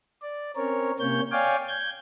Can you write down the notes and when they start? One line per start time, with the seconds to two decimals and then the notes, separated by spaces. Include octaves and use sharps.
0.22 D5
0.56 C4 C#4 A#4 C#5
1.00 C3 A#3 C#4 C#5 G6
1.32 C#5 D5 F5 G5 G#5 D6
1.68 G6 G#6